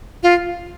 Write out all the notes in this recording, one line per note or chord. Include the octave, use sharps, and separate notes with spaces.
F4